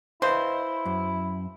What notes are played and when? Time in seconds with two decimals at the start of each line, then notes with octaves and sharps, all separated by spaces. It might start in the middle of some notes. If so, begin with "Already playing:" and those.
0.22 E4 B4 C5 D#5 F5
0.86 F#2